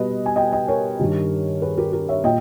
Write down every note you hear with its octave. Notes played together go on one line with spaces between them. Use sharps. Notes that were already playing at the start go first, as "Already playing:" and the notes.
Already playing: B2 G3 B4 D#5
G#5
D#5 G5
D#5 G5
A#4 C#5
G2 D#3 G3
G#4 B4
G4 A#4
G4 A#4
C#5 E5
A#2 D#5 G5